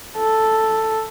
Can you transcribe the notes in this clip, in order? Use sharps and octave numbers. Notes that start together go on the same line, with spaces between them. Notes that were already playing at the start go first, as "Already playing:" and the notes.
A4